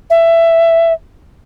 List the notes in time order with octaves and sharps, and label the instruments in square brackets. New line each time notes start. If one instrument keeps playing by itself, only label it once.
[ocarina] E5